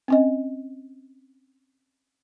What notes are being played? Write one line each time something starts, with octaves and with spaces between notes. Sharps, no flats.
C4 C#4 D#5